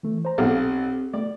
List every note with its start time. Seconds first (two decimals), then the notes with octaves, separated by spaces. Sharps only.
0.03 E3 A3
0.25 C5 A#5
0.38 B1 C4 G4 A4 F5
1.14 A3 D5